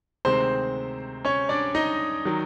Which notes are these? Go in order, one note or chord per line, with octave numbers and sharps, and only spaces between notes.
D2 C3 D#3 G#3 C4 C5
C#4 C#5
D4 D5
D#4 D#5
D#3 F#3